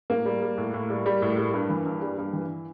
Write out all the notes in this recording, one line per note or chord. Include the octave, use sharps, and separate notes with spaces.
A2 A#3
G3
G3
A2
A2
G3
G3
A2
G3
G2
E3
G2
G3
G2
E3